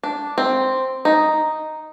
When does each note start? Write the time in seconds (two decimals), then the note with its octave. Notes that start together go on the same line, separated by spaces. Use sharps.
0.04 D4
0.38 C4
1.05 D#4